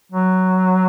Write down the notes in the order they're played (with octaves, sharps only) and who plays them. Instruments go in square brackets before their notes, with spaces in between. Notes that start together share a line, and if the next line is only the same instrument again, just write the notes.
[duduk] F#3